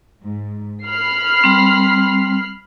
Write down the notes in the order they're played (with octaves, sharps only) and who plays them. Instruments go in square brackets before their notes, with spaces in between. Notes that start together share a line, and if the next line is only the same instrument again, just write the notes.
[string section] G#2
B5 F6 C7
[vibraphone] G3 C4